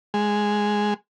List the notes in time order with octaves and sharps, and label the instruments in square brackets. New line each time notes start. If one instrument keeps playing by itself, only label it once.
[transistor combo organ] G#3